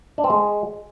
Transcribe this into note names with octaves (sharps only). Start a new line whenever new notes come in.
D4
C4
G#3